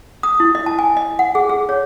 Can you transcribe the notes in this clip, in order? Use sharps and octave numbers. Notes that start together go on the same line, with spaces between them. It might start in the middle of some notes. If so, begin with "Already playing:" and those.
D#6
E4
D#5
A5
G#5
D#5
F#5
G#4
G#4
C#5